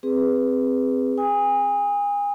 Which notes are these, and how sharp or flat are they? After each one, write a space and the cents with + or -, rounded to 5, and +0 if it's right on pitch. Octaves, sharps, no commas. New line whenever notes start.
C4 +0 G#4 -20 B4 +0
G#5 -35 D#6 +20